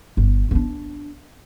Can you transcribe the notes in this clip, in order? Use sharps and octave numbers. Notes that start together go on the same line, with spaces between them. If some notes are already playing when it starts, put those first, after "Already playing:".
G1
B3 D4